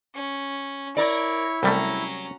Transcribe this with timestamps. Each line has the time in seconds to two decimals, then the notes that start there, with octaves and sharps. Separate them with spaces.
0.14 C#4
0.97 E4 A#4 C#5 D5
1.63 C2 F#3 G3 A3 C#4 A#5